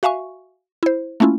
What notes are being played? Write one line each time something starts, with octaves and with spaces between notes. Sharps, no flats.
F#4 E5 F5 G#5 C#6
E4 C5
A3 A#3 C#4 E4 F4